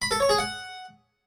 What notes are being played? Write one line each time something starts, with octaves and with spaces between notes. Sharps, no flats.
B5
A4
C#5
G#4
F#5